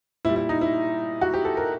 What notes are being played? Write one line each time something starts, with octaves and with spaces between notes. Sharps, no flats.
A#2 G3 E4
E4
D#4
E4
F#4
G4
A4
A#4